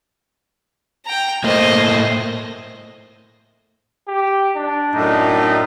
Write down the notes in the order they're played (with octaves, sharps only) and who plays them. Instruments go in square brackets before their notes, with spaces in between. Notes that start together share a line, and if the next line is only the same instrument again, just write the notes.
[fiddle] G5 A#5
[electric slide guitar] A2 A3 A#3 [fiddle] C5 D#5
[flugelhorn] G4
D4
[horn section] F#2 A2 D#4